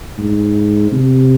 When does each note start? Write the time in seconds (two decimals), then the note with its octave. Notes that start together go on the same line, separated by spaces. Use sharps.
0.18 G#2
0.92 C3